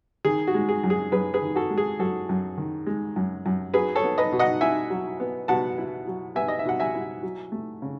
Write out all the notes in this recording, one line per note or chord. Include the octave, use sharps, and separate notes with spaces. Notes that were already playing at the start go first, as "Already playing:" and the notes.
D#3 G#4
F#4
G#3
G#4
F#2
G#4
F#2 G#4 B4
G#4 B4
D#3
F#4 A4
G#3
G#4
F#2 F#4 A4
F#2
D#3
G#3
F#2
F#2
F#3 G#4 B4
A4 C#5
B3
B4 D#5
B2
D#5 F#5
E4 E5 G#5
F#3
B3
B2 F#5 A5
E4
F#3
B3 E5 G#5
D#5
E5
B2 F#5
E5 G#5
E4
F#3
A3
C#3